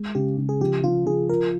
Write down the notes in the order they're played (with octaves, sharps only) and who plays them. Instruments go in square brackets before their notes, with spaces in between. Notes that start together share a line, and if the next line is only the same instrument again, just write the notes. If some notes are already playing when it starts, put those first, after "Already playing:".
Already playing: [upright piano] G#3
[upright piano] C#3 [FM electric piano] G4
[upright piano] C#3
[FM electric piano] G#4
[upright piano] F3 [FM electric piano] G4
[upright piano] F3 [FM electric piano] F4
[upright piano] F3 [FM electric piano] G#4
[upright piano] F4 [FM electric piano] A#4